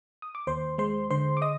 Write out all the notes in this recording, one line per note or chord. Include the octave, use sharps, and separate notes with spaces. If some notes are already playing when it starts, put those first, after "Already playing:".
D#6
D6
D#2 C5 C6
G#3 C5 C6
D3 C5 C6
D6
D#5 D#6